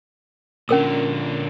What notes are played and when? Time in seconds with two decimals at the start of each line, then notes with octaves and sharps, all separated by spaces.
0.69 A#2 D3 C#4 A#4 E6